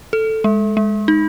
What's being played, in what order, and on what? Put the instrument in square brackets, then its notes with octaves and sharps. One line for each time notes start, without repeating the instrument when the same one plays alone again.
[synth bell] A4
G#3
G#3
D#4